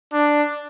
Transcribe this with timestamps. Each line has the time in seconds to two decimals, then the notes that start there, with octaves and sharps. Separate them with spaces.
0.13 D4